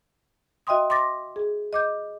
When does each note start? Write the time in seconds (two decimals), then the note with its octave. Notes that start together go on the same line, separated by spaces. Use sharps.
0.67 F#4 D#5 E5 G5 C6 D#6
0.90 C6 D6 A6 A#6
1.36 G#4
1.73 D#5 D6 G6